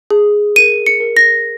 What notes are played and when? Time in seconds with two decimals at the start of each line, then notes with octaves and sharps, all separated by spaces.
0.10 G#4
0.56 A#4 D#7
0.86 C#7
1.00 A#4
1.17 A#6